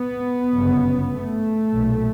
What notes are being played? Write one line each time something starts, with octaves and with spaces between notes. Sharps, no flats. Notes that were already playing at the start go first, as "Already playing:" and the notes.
Already playing: B3
G1 F#2 C#3
A3
B1 A#2